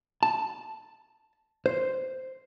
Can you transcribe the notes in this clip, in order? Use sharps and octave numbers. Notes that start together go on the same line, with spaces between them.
A5
C5